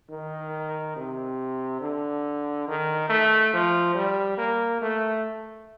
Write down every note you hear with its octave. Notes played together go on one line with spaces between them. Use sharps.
D#3
C3
D3
D#3
A3
F3
G3
A#3
A3